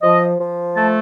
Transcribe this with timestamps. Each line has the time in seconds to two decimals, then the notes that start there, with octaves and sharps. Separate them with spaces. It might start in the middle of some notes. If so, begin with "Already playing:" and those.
0.02 F3 D#5
0.39 F3
0.75 A3 A5